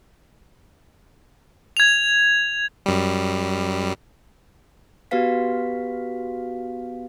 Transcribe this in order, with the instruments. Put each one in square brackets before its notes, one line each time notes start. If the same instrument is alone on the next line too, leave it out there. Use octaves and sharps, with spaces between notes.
[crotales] G#6 F7
[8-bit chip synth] F#2 G3
[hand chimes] B3 F#4 G4 B4 F5 B6